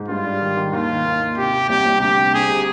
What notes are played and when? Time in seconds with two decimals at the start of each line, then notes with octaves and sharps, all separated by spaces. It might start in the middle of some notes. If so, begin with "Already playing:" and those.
Already playing: G#2
0.08 G2 F4
0.25 G3
0.41 D#3
0.57 D#3
0.73 D#2 F4
0.89 D#3
1.05 D#2
1.21 D#2
1.37 C3 G4
1.53 C3
1.70 C2 G4
1.85 C2
2.01 D2 G4
2.17 C3
2.33 D2 G#4
2.49 C3